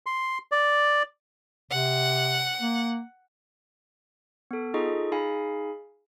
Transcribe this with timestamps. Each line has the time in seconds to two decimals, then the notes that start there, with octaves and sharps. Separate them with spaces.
0.06 C6
0.52 D5
1.71 C3 F#5
2.61 A#3
4.51 B3 A4
4.74 D#4 F4 G#4 A4 D#5 C#6
5.12 D#4 G#4 F5 G#5 B5